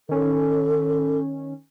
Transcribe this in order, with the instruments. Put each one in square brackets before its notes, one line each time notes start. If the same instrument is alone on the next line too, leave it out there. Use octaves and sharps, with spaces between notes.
[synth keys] D#3 C#4 [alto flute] A4